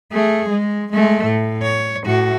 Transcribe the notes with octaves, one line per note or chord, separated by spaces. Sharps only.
A3 G#4
G#3
G#3 A3
A2
C#5
A2 F#4